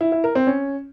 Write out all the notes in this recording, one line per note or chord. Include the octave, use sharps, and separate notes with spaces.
E4
E4
A#4
C4
C#4